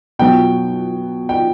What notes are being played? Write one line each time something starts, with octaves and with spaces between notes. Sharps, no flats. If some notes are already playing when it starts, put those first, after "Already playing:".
B2 F#3 G5
G5